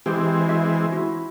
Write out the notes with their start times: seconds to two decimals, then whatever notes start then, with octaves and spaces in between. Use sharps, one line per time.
0.06 E3 G#3 C4 G4 G#4
0.47 F#4 E5
0.92 E4 F#4